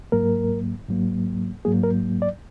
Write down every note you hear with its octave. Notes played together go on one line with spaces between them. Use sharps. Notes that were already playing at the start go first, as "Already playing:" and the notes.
G#2 F#3 A#3 A#4
G#2 F#3 A#3
G#2 F#3 A#3 G#4
A#4
D5